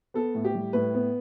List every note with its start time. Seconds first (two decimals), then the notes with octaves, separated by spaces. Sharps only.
0.14 B3 A4
0.35 A2
0.45 G4
0.55 G3
0.73 A2 B4
0.94 B3